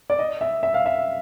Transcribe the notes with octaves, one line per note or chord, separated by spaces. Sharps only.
D5
D#5
E5
E5
F5
E5